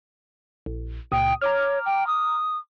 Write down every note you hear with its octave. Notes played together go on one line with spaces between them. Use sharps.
A#1
C#2 A#2 G5 D#6
C#5 A#5 D6 F6
G5
D#6